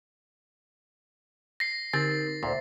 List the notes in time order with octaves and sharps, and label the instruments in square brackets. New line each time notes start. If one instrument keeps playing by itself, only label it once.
[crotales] A#6 C7
[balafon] D3 [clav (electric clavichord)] C4 [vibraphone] D#4 A#4 [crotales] A6
[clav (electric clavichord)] D2 A#2 [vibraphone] C5 E5